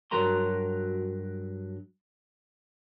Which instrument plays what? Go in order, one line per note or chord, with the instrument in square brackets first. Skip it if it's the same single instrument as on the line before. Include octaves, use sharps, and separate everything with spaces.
[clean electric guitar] G2 F#3 F#4 A#4 A#5 C6